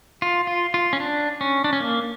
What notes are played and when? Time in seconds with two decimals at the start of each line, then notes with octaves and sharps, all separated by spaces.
0.22 F4
0.47 F4
0.74 F4
0.93 C#4
1.00 D4
1.41 C#4
1.64 D4
1.73 C#4
1.80 A#3